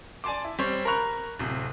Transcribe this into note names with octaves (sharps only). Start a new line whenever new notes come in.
D5 G#5 A5 C6 D6
E4
G3 C4 C#5
A#4 A#5 B5 C#6 F#6 F7
D1 C3